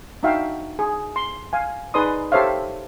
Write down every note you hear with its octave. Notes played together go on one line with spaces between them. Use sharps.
D4 D#4 F#4 E5 F5 G5
G#4
C6
F5 G#5
D#4 G#4 B4 D5 C6 D#6
G4 A4 C5 C#5 E5 F5